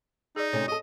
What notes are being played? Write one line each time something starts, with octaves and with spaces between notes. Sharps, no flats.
D#4 G#4 D5
C3 A3 C#4 C#5
F#4 A4 D#5